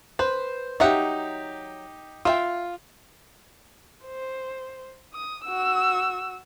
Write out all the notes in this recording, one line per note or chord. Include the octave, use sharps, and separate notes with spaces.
B4 C5
F#3 D#4 G4 E5 F#5
F4 C5 E5 G5
C5
D#6
F#4 E6